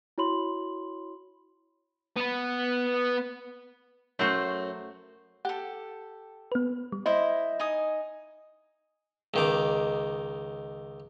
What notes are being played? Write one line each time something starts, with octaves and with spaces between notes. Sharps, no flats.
E4 F#4 C#5 B5 C6 F#7
B3 B4
F#2 A3 F#4 C5
G4 A4 F#5
B3 B4
G3
E4 C5 D#5 E5
D#4 G#5 D#6
C#2 D#3 D6